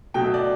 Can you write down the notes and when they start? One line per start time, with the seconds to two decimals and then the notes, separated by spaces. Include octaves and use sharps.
0.14 B2 F#3 A3 G5
0.24 E5
0.34 D5